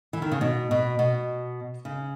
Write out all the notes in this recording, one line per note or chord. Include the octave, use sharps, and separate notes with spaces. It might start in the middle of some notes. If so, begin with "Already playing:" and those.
E3
D#3
C#3
B2
B2
B2
C#3